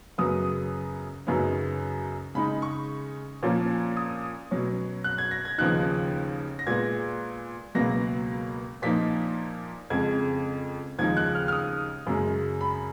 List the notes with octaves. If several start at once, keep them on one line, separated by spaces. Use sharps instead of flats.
F#2 C#3 F#3 B3 D#6
F#2 C#3 F#3 B3 D#4
C#3 G#3 D#4 B5
C#6
A#2 F3 A#3 C#4
D#6
B2 F#3 C#4
F#6
G#6
A#6
G#6
D#2 C#3 F3 B3 D#4 F#6
A#6
A#2 G#3 B3 G#6
C#2 B2 F#3 A#3 A#6
A#2 F3 A#3 D#4 B6
F2 C#3 G#3 G#6
D#2 C#3 F3 G#3 D#4 G#6
F#6
F6
F6
D#6
F#2 C#3 G#3
B5